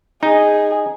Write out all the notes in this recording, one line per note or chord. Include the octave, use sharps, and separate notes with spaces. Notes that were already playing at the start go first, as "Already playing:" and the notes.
D#4 G#4